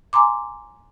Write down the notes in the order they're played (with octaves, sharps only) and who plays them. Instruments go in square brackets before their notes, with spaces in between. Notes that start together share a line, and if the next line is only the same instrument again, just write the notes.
[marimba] G#5 A#5 C6 D6